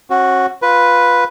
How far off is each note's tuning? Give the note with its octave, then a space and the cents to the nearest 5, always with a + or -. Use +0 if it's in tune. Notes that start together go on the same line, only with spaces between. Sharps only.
C#4 -40 F#4 +0
F4 +10 B4 +0